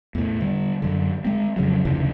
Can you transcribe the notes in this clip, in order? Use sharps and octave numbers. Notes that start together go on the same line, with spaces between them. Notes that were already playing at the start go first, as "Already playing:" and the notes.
E2 A2
D3 G3
F#2 D3
G#3 C4
F2 C#3 F#3
F1 D2 C#3 E3